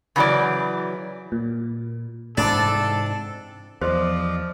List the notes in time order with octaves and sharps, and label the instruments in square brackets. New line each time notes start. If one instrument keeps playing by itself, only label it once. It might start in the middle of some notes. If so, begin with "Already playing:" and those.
[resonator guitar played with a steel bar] C#3 E3 F#3 E4 D5
[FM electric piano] A#2
[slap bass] G#2 C3 E3 [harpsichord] D4 [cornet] A4 [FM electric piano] A6
[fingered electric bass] E2 [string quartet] F3 [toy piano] G4 C5 C6 [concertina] D5 D#5 F5